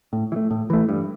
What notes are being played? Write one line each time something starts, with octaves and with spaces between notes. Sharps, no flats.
A2
E3
A3
A2
E3 A3
G2